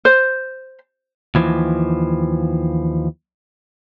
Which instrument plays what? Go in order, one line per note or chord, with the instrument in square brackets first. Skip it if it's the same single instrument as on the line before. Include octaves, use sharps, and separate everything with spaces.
[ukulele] C5
[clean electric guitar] D#2 E3 F3